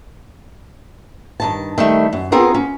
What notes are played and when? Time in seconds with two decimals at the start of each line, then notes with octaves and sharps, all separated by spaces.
1.40 G2 D#3 A5
1.78 D#3 G3 A3
2.13 F#2
2.32 B3 C4 F4 G#4 A#4
2.54 C#4